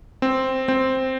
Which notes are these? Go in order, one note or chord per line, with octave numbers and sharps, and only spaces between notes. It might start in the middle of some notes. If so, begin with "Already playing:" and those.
C4
C4